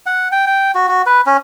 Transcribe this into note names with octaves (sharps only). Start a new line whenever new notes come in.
F#5
G5
G5
F#4
F#4
B4
C#4